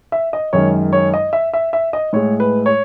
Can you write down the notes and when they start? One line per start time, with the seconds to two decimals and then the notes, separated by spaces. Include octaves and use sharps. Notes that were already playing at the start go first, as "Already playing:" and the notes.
0.12 E5
0.33 D#5
0.53 F#2 D#3 G#3 C#5
0.93 C#5
1.14 D#5
1.33 E5
1.54 E5
1.73 E5
1.93 D#5
2.13 A2 G#3 C#5
2.40 B4
2.66 C#5